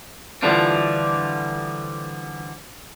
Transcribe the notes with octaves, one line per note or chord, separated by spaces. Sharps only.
D3 E3 F3 G3 D4 F4